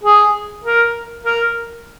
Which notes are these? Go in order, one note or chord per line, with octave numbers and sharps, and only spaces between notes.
G#4
A#4
A#4